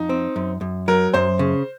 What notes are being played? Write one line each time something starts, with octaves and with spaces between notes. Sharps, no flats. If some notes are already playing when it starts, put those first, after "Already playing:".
Already playing: F2 D#4
C4
F#2
F#2
F#3 A#4
F#2 C5
C#3